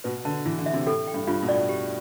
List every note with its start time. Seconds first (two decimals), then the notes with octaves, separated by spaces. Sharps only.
0.04 B2 B4
0.25 D3 A5
0.46 E3 E4
0.59 D3
0.66 E5
0.73 C3
0.86 A2 A4
1.07 G5
1.14 G2
1.27 G2 F4
1.42 B2
1.48 A2 D5
1.69 G4